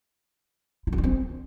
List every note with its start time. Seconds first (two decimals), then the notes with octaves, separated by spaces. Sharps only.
0.87 E4
0.93 F4
0.98 D4
1.04 C4